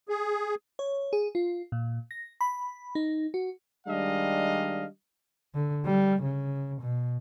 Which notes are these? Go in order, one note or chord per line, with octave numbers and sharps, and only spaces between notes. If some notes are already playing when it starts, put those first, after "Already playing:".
G#4
C#5
G#4
F4
A#2
A#6
B5
D#4
F#4
D#3 G3 G#3 D4 D#5 F5
D3
G3
C#3
B2